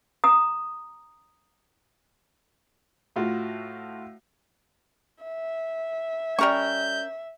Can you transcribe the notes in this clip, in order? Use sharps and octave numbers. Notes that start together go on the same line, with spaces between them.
A#5 D#6
A2 F4 F#4
E5
G3 C#4 A#4 C#6 G6